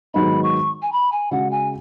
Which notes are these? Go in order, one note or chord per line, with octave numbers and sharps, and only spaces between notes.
G#2 D#3 F#3 B3 D#4 B5
C#6
G#5
B5
G#5
C#3 G#3 C#4 F#4 F#5
G#5